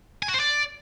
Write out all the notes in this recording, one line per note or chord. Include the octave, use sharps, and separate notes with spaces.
G#5
F#4
C5
D5